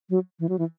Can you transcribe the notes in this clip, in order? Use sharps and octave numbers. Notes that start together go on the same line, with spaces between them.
F#3
E3
F#3
E3